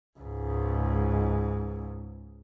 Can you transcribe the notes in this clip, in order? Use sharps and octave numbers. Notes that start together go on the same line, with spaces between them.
C#2 G#2